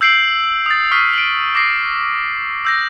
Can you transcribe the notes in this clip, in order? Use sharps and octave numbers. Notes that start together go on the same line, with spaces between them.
E6 G6 C7 D7 F#7
D#6 A6
C#6 D#6 F6 B6 C7
D7 F#7
D6 A#6 C7
E6 G6 A#6